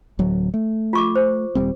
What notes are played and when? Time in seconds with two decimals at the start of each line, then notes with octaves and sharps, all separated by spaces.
0.19 D1 F#3
0.54 A3
0.93 F4 C#6 D6
1.16 C5
1.55 D#1 G3 C4